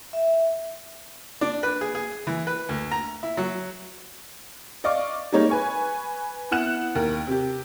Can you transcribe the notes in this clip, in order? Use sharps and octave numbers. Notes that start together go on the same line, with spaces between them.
E5
D4
B4
G#4
G#4
E3
B4
D2
A#5
E4
F#3
D5 D#5 F5 C#6 D6
G3 G#3 A#3 D#4 C#5
B4 G#5 C#6
B3 E4 F#5 F#6 E7
D#2 A#4
C3 G4